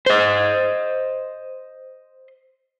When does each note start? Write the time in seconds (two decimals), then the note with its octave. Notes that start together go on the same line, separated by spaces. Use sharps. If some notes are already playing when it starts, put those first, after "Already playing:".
0.06 C5 D#5